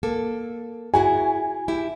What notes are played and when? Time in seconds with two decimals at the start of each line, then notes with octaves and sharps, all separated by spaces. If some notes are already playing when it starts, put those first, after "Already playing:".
0.03 A#3 A4
0.94 E4 F#4 G#4 G#5
1.68 E4 G4